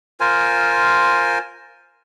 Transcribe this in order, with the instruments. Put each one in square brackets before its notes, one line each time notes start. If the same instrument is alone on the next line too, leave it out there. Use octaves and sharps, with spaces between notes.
[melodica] F4 A#4 C5 G#5